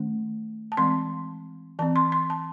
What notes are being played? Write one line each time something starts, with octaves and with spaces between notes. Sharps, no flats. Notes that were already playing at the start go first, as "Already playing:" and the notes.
Already playing: D#3 A3 C#4
A5
E3 G#3 C4 C6
E3 C4 A5
C6
C6
A5